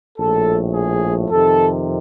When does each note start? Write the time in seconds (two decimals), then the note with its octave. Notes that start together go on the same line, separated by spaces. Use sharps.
0.19 A#1 A2 F3 A4
0.74 G#4
1.30 F2 C3 D#3 A4